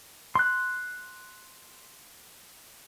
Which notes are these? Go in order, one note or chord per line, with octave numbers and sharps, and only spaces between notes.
C6 F#6